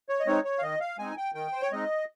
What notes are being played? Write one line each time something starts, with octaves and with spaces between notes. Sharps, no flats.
C#5
D#5
G#3 C4 D#4 C#5
C#5
F5
D#3 D#5
F5
G#3 C4 D#4 G#5
G5
D#3 G5
C5
C#5
G#3 C4 D#4 D#5